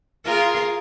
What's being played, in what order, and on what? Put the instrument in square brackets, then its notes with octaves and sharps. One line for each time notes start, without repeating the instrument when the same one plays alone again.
[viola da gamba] F4 G#4 A#4